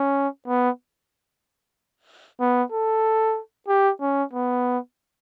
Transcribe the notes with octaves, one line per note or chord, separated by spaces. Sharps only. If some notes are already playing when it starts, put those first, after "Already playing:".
Already playing: C#4
B3
B3
A4
G4
C#4
B3